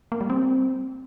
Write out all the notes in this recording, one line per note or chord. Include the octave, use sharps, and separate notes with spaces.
A#3
G3
C4